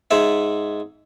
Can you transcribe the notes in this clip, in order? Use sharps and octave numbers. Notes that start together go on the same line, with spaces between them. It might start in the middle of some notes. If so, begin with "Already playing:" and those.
G#2 G#3 E5